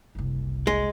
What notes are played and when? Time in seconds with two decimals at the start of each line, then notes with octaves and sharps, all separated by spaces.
0.15 F#1 C2
0.67 G#3